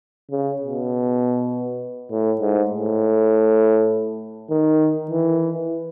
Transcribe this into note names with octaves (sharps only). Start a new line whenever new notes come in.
C#3
B2
A2
G#2
A2
D#3
E3